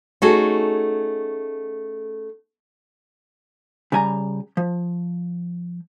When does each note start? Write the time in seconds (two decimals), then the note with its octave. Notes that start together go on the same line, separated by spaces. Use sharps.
0.22 A3 C#4 D#4 F#4 G#4 A4
3.92 C#3 G3 G#5 A#5
4.57 F3